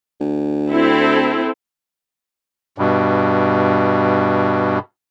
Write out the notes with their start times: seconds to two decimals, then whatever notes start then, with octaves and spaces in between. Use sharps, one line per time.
0.20 D2
0.70 C4 E4 A4
2.78 G2 B2